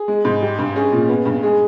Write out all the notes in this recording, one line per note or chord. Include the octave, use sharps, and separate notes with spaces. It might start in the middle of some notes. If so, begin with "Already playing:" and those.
Already playing: G#4
G#3
G#2
G3
G2
C#4 G#4
A#2
B3
G2
G#3 G#4